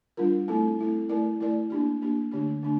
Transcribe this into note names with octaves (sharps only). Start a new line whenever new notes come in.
G3 D4 F4 A#4
A3 C4 E4 A4
A3 C4 E4 A4
A3 E4 A#4 D5
A3 E4 A#4 D5
A#3 D4 G4
A#3 D4 G4
D3 A3 D4 G4
D3 A3 D4